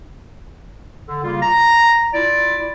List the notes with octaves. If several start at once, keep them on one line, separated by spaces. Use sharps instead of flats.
D3
C#3 G3 A#3 F4
A#5
E4 F4 D5